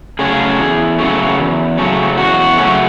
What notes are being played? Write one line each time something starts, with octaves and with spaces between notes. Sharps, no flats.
C#3 F#3 A3 C#4 G#4
E2
C#3 F#3 A3 C#4
E2
C#3 F#3 A3 C#4
E2 F#4
C#3 F#3 A3 C#4